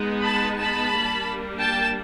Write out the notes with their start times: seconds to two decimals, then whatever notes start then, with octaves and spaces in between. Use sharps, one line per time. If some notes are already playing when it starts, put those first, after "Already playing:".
Already playing: G#3 B3 D#4
0.25 A5 B5
0.59 A5 B5
0.92 G3 A#3 D4
1.60 G5 A5